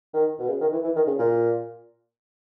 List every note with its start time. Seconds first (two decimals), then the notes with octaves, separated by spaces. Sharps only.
0.14 D#3
0.39 B2
0.49 C#3
0.61 D#3
0.72 E3
0.84 E3
0.96 D#3
1.07 C#3
1.18 A#2